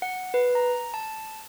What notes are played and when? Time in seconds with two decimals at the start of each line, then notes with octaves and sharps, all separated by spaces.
0.02 F#5
0.34 B4
0.55 A#5
0.94 A5